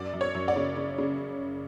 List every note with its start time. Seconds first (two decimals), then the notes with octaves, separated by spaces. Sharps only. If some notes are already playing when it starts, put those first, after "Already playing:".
Already playing: F#2 D5
0.13 F#2
0.21 C#5
0.35 F#2
0.48 D5
0.56 C#3
0.77 C#3
0.98 C#3